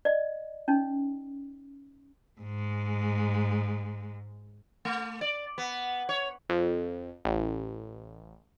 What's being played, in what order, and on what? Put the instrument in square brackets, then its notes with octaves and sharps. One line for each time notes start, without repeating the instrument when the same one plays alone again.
[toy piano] D5 D#5
C#4 D#4
[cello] G#2 G#3
[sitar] A3
D5
B3
C#5
[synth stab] F2
A1